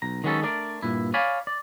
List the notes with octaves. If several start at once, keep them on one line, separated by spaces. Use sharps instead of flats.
B1 A#5
D#3 F#3 G#3 B3 C#4 A4
A3 D4 A#4 D5
G2 A#2 E4
C#5 D5 F5 G#5 B5
D5